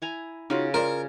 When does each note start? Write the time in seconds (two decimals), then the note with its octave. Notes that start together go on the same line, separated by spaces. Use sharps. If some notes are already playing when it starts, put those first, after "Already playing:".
0.02 E4 G#5 A#5
0.50 C#3 D#4 F4 F#4
0.74 F4 A#4 C5 D5